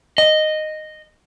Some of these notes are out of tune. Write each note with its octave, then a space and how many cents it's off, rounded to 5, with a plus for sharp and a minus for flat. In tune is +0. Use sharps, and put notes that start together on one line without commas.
D#5 -10